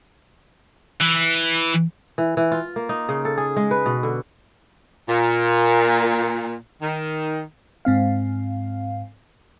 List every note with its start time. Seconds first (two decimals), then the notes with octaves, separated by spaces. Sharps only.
1.00 E3
2.18 E3
2.37 E3
2.52 F4
2.76 A#3
2.89 D#4
3.09 C#3
3.25 A4
3.37 G#4
3.56 G#3
3.71 B4
3.86 B2
4.03 D3
5.07 A#2
6.81 D#3
7.85 G#2 C4 F5